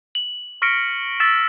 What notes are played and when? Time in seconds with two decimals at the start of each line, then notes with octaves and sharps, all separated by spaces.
0.15 F#7
0.62 C#6 F6 A#6 B6 C#7 D7
1.20 E6 A6 B6 E7